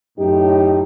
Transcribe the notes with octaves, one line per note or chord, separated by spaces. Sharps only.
F#2 A2 D#4 G4